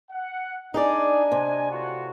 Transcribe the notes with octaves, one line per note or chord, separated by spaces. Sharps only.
F#5
D4 D#4 G#4 D5 D#5 G#5
C3
A2 F4 F#4